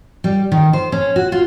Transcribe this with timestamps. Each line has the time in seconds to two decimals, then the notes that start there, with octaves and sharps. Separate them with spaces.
0.24 G3
0.52 D#3
0.73 C5
0.92 C#4
1.16 F#4
1.32 F4